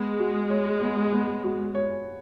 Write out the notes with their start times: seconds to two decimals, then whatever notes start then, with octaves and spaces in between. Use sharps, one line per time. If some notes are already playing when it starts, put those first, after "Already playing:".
Already playing: G#3 B3
0.19 F#4
0.50 C#5
0.81 B3
1.12 B3
1.44 F#4
1.75 C#5